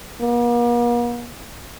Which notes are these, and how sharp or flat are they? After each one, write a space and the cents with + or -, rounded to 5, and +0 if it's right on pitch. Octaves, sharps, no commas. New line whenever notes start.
A#3 +45